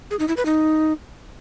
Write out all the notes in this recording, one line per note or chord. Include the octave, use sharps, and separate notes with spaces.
G#4
D#4
E4
B4
D#4